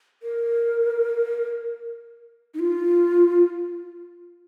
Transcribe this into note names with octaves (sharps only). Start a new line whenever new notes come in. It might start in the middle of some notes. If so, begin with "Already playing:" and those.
A#4
D#4
F4